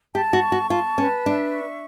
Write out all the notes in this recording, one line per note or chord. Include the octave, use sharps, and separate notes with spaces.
G4 A5
F#4
C#6
F#4
F4 A5
C#4 B4
D4 E5
C#6